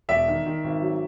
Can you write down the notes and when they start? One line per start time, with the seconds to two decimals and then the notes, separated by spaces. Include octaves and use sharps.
0.09 E1 D5 E5
0.28 D#3
0.46 D#3
0.64 G#1
0.82 F#3